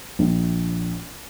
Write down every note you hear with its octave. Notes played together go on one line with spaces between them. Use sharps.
A#1